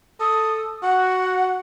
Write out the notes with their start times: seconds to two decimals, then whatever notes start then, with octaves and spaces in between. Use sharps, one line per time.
0.21 A4 D#6
0.83 F#4 F#5